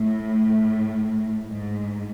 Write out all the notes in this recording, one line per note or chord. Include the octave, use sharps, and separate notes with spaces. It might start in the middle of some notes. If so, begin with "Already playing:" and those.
Already playing: A2
G#2